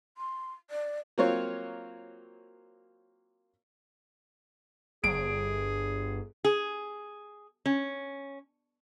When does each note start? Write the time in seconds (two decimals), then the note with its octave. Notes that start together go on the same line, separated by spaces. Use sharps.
0.18 C6
0.70 D5
1.18 F#3 A#3 C4 F4 C#5
5.04 G1 G#4 D7
6.45 G#4
7.66 C#4